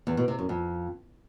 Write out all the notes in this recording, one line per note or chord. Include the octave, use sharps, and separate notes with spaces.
E2
B2
C3
F#2
F2